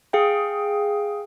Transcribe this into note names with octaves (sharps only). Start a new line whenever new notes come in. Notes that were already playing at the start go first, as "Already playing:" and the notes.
G#4 F5 G5